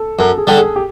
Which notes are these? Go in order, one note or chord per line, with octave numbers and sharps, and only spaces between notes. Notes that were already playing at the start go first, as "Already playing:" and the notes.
Already playing: A4
F#2 A4
G#4
D3 G3 A4
G#4
G4